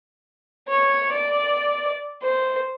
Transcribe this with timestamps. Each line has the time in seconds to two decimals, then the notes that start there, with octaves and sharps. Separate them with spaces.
0.68 C#5
1.12 D5
2.23 C5